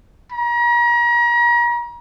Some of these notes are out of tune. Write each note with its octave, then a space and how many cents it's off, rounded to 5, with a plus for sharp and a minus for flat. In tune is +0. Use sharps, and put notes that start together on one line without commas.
A#5 +40